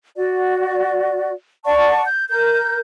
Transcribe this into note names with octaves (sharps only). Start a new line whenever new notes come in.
F#4 D5
D5 F#5 A5 C#6
G6
A#4 G6